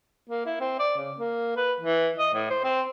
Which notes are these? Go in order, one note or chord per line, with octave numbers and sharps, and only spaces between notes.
A#3
E4
C4
D5
C#3
A#3
B4
E3
D#5
A2
C5
C4